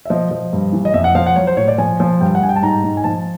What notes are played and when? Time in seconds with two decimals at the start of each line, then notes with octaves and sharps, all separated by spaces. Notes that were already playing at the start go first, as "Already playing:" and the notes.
0.05 E5
0.10 F3 D#5
0.31 F3
0.53 G2
0.73 E3
0.85 D#5
0.94 F2 E5
1.04 F#5
1.15 F3 F5
1.26 F#5
1.36 F#3 C#5
1.47 C5
1.57 A2 C#5
1.68 D5
1.78 F3 G#5
2.00 F3
2.21 G2 G5
2.35 F#5
2.41 G2 G#5
2.49 G5
2.56 A5
2.62 G#2 A#5
2.83 G#2
2.97 G#5
3.04 F3 A5